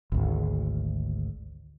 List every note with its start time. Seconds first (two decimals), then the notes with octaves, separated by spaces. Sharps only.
0.12 G#1 D2